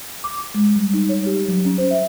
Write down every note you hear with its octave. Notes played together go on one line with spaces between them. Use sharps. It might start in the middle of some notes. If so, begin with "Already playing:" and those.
D6
G#3
G3
D#4
C#5
G4
F#3
C#4
C5
E5